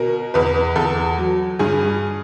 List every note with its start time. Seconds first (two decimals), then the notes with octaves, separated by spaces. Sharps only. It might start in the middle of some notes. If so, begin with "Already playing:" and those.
Already playing: B2 A#4
0.34 E2 B4
0.76 E2 A4
1.18 F#3
1.59 G2 G#4